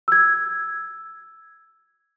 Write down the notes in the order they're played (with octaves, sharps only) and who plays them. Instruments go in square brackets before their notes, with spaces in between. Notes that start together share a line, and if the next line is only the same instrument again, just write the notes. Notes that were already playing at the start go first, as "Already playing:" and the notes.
[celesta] E6 G#6